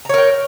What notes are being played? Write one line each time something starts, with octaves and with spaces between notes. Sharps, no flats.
A#4 C#5 G5 A#5